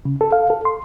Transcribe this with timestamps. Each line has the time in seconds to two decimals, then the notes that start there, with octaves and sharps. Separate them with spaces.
0.05 C#3
0.21 A4
0.32 F5
0.50 A4
0.65 C6